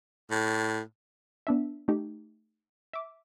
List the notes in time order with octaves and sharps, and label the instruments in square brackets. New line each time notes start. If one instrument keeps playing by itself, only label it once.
[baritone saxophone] A2
[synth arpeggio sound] B3 D4 E5
A3 D#4 G4
E5 D6